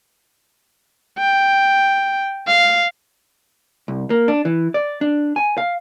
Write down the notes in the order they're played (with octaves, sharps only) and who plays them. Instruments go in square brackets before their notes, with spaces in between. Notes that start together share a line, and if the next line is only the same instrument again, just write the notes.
[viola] G5
F5
[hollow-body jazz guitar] C2
A#3
D4
E3
D5
D4
G#5
F5